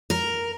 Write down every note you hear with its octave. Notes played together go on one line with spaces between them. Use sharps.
A#4